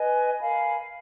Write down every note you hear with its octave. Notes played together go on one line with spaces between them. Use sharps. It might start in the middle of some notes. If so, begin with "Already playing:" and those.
Already playing: B4 D#5 G#5
A#4 F5 G#5 B5